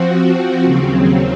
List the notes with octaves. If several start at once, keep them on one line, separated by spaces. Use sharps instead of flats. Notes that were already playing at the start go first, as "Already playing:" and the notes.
Already playing: F3 C4 F#4
D#2 C#3 F#3 C4